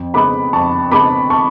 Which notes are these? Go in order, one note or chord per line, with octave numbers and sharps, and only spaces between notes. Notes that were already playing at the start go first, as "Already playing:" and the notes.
Already playing: F2
C#3 G#3 B3 B5 D6
F2 A5 C#6
C#3 G#3 B3 B5 D6
A5 C#6